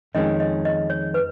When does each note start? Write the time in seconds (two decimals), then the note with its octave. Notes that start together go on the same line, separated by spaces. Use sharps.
0.15 F2 D#3 G#3 C#4 D#5
0.40 D#5
0.65 D#5
0.90 C#5
1.14 B4